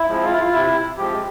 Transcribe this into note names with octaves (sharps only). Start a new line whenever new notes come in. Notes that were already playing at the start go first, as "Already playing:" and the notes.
Already playing: E4
F3 G#3 C4
F4
E4
F4
C3 E4
F3 G#3 C4 G4